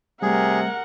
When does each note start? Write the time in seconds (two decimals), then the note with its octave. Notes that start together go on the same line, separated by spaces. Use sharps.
0.22 C3 G3 A3 G#4 A#4 F#5